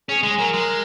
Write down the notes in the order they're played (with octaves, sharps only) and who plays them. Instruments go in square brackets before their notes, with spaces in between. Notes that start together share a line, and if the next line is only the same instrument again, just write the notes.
[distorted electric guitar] C#4 [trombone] G#4
[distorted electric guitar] G#3
[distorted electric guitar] F#3 [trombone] A#4
[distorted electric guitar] G#3